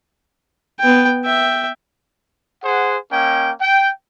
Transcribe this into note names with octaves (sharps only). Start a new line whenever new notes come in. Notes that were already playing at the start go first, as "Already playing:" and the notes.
B3 G5
E5 G5
G#4 C5 F#5
A#3 C#4 D#5 G5
G5